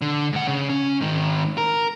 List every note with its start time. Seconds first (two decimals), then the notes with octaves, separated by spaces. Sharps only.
0.01 D3
0.33 G#2 F#5
0.47 C#3
0.69 C#4
1.01 G#2 D#3
1.58 A#4